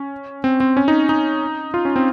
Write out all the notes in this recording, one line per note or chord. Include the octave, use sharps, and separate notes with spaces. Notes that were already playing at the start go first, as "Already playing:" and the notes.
Already playing: C#4
C4
C4
C#4
D#4
D#4
F4
C#4
C4